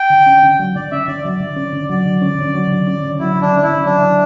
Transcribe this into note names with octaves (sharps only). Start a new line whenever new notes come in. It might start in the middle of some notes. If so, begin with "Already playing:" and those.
Already playing: G5
D3
C#4
D3
F#3
D3 D5
C#4 E5
D3 D5
F#3 D5
D3
C#4
D3
F#3 D5
D3
C#4
D3
F#3
D3
C#4
D3
F#3 E4
D3
D4
C#4
E4
D3
F#3 D4
D3